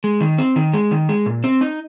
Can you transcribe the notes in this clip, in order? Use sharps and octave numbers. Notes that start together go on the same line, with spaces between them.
G#3
D#3
C4
D#3
G#3
D#3
G#3
A#2
C4
D#4